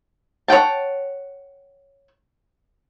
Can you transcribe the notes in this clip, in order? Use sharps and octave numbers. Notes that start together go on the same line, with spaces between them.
C#5 F#5 G5 A5